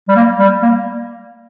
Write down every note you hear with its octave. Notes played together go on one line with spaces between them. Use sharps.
G3
A#3
G3
A#3